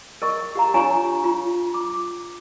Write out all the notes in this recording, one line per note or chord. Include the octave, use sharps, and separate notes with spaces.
A#4 D#5 C#6
G4 F5 A#5
D4 F4 C#5 G#5 A#5 C#6
F4
D6